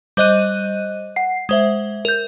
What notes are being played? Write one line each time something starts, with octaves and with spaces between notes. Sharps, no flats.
G3 C5 D#5 F#6 D#7
F#5 C7
G#3 C5 E5
A#4 G6